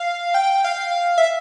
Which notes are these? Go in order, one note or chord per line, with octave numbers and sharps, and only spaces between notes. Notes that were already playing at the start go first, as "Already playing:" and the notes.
Already playing: F5
G5
F5
E5